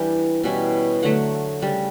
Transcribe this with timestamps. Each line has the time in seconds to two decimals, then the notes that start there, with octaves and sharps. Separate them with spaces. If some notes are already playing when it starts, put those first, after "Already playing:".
Already playing: E3 G3 D4 G5
0.44 B2 G3 C#4 E4
1.03 D3 F#3 A3 F#5
1.61 C#3 G3 D4